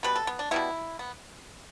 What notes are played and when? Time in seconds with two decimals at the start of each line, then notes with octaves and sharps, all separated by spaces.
0.03 B2 G3 B3 B4
0.15 A4
0.27 B3
0.39 D4
0.51 B2 G3 B3 E4
0.99 B3